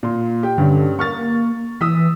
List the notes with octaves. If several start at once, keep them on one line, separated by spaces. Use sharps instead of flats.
A#2 C6
G4 G5
G2 D3 C#4
A#3 C#6 F6 A6
E3 D#6 E6 B6